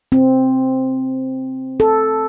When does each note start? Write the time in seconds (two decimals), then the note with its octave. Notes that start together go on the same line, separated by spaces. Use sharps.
0.12 C4
1.80 A4